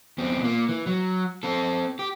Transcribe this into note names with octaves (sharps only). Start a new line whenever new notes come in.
E2 C4
A#2 A#3
E3
F#3
C4 A4
G4